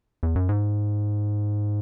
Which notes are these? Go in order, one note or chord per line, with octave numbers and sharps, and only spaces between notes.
E2
F#2
G#2